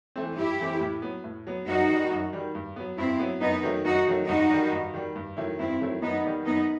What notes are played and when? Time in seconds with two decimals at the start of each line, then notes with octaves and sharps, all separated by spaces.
0.16 E3 A3 C4
0.38 G2 E4 G4
0.59 E3 A3 C4
0.80 A2
1.02 F#3 B3
1.24 A2
1.47 F#3 B3
1.67 F#2 D#4 F#4
1.89 D#3 G3
2.11 F#2
2.33 D#3 G3
2.55 G2
2.76 F#3 B3
2.98 G2 C4 E4
3.19 F#3 B3
3.41 F#2 B3 D#4
3.63 D#3 F#3 A3
3.85 F#2 D#4 F#4
4.07 D#3 F#3 A3
4.28 G2 D#4 F#4
4.50 D#3 G3
4.72 G2
4.94 D#3 G3
5.16 G2
5.37 D#3 F#3 A3 E4
5.59 G2 C4 E4
5.81 D#3 F#3 A3 E4
6.02 F#2 B3 D#4
6.24 D#3 G3 B3
6.46 F#2 B3 D#4